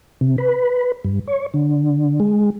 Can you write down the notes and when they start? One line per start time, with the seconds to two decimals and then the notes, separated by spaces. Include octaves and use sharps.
0.21 C3
0.38 B4
1.04 G2
1.27 C#5
1.54 D3
2.20 G#3